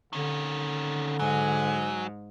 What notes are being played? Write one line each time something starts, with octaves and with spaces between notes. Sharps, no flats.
D3 D#3 C#4
G#2 F#3 G#5